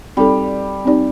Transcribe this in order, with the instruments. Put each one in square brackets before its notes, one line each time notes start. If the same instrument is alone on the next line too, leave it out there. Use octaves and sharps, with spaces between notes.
[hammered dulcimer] G3 [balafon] C4 D#4 A4 D5
[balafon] C4 D#4 G4 D5